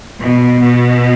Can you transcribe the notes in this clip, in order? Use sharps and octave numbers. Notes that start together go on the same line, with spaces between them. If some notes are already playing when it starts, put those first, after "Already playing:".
B2
B2